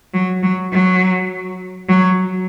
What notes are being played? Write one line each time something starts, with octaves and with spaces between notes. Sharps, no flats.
F#3
F#3
F#3
F#3